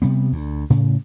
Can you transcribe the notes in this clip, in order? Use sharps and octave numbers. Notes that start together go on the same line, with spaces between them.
C3 G3 B3
D2
A2 C#3